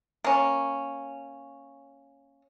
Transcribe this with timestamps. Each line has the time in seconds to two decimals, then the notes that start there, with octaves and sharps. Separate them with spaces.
0.24 A#3 C#4